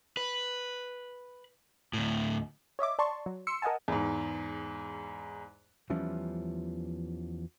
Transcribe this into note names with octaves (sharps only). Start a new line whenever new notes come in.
B4
D2 A2
C#5 D#5 E5 D6
D5 A5 C6 C#6
F#3
C6 E6 C#7
A#4 D#5 F#5 G#5 A5
E2 G#2
E2 E3 F3 G3 C#4